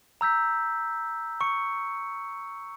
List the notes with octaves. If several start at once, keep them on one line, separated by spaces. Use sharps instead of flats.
A#5 E6 G6 B6
C#6 C#7